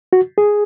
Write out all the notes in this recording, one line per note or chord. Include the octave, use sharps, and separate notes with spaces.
F#4
G#4